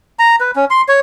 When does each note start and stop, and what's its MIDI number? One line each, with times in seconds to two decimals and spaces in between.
0.19 0.36 82
0.40 0.51 71
0.56 0.65 61
0.70 0.82 84
0.88 1.00 73